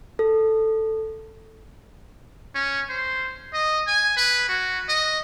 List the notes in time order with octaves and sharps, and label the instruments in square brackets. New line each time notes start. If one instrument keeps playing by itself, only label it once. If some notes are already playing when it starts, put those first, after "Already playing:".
[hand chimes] A4
[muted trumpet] C#4
C5
D#5
G#5
B4
F#4
D#5